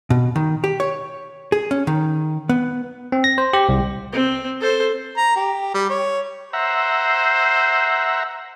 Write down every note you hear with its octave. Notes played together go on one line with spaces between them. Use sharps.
B2
D#3
G4
C#5
G#4
C#4
D#3
B3
C4
A#6
C5
G4
C2
C4
A4 C5
A#5
G4
G3
C#5
C5 E5 F#5 A#5